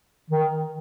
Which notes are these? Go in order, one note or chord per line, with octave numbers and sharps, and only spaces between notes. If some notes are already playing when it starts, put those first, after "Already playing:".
D#3